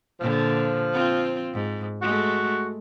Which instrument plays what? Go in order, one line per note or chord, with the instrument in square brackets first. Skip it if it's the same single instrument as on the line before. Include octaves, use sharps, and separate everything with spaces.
[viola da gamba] A#2 D3 [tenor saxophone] F3
[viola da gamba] C4 F4
G#2
[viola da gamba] G#3 A3 [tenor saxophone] F#4